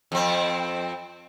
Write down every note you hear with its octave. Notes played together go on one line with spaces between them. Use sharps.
F2 C4